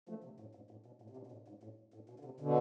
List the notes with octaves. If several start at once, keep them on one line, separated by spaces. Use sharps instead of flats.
F3 A3
C3
A2
G#2
A2
B2
A2
C3
B2
B2
A2
G#2
A2
A2
B2
D3
C3
B2 D3